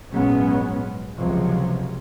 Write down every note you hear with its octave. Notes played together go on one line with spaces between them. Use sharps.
A#1 G#2 F#3 G#3 B3 C#4
C#2 C3 F3 F#3 G#3